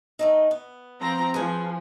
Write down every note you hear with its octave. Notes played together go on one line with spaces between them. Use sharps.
D#3 A3 D#4
B3
F3 C4 A#5
F3 G#4 B4 G#5